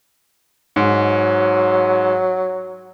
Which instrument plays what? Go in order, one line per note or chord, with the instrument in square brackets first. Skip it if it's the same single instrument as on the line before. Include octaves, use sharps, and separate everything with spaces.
[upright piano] G#2 [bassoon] F#3